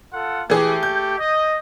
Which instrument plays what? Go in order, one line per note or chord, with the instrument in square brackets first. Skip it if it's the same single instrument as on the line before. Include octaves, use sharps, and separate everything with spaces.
[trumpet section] F4 A4 F#5
[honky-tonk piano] E3 G#4 [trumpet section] A3 G4
[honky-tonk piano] G6
[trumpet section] D#5